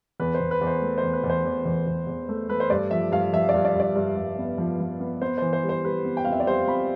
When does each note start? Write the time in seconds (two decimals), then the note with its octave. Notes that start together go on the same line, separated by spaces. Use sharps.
0.20 E2 B4
0.34 C5
0.40 E2
0.51 B4
0.61 E2
0.67 C5
0.82 A3
0.98 C5
1.03 E2
1.13 B4
1.24 E2
1.30 C5
1.45 E2
1.66 E2
1.87 E2
2.07 E2
2.29 A3
2.49 A3 B4
2.60 C5
2.70 G2 D5
2.91 F3 E5
3.12 G2 F5
3.33 F3 E5
3.49 D5
3.54 G2
3.65 D5
3.75 G2 D5
3.95 G2
4.17 G2
4.38 B3
4.58 F3
4.80 F3
5.00 B3
5.22 B3 C5
5.38 E3 C5
5.53 C5
5.64 G3
5.69 C5
5.85 G3 B4
6.05 B3
6.17 G5
6.25 F2 F5
6.32 E5
6.40 D5
6.47 G3 C5
6.68 F2 B5